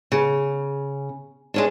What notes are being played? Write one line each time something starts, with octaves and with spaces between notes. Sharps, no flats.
C#3
G#3 C#4 D4